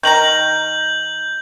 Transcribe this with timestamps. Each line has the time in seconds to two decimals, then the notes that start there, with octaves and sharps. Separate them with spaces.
0.03 D#3 A#4 A#5 G6 F#7